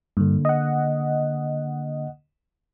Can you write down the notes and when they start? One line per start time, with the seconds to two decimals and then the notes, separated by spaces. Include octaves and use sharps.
0.17 G2 D3 A#3
0.45 D#5 F#5